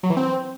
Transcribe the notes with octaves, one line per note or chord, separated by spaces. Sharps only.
F#3
E3
C4